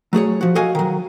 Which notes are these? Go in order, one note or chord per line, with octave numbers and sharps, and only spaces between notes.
F#3 A3 G#4 C#5
F3 F#4
F#4 A4 D#5 F5 G#5
D#3 F#3